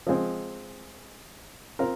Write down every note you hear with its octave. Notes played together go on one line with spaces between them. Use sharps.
F3 G#3 C4
C4 F4 A#4